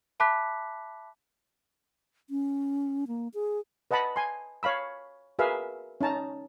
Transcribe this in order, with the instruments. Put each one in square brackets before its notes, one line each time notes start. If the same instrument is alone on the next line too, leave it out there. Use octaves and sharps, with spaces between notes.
[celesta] E5 A5 B5 D6 F#6 B6
[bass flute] C#4
A#3
G#4
[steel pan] B4 D#5 F#5 A5 B5
G#5 C6
C#5 F5 B5 E6
F#4 G#4 A#4 B4 E5 F5
C#4 D#4 A5 A#5